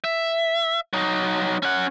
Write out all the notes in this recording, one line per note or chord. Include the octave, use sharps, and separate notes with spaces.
E5
F#3 D#4
C#4 F#5